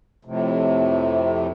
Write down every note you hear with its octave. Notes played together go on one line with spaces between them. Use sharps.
F2 A2 C3